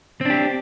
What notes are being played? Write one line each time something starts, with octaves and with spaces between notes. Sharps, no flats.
C4 D4 G4